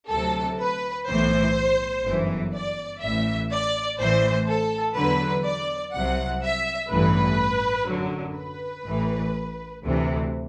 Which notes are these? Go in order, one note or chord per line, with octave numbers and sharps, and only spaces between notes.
D2 C3 F#3 A4
B4
B1 A2 E3 C5
G1 F#2 E3
D5
A1 A2 E3 E5
D5
A1 A2 E3 C5
A4
E2 D3 F#3 B4
D5
C2 C3 F#3 F#5
E5
A1 G2 E3 B4
F#2 D3 F#3
B4
A1 A2 E3
D2 C3 E3